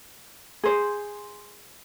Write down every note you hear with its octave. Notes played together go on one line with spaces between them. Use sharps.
G#4 C5